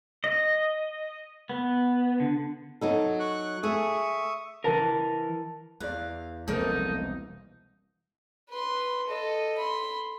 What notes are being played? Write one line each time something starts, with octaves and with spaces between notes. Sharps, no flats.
D#5
B3
D3
F#3 D#4 A4
C#6 F#6
A3 G#4 E5 C#6 D#6
E3 A#4 A5 A#6
E2 B4 D5 F5
E1 C2 F3 A#3 D#4 A4 A#4 C5
B4 C6
A4 D#5
B5 C6